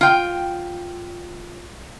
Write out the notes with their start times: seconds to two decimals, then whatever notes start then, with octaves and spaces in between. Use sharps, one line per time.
0.01 F4 G5